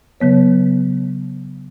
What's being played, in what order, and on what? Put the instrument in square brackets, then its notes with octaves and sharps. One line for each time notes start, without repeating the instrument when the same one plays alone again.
[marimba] C#3 F#3 B3 C#5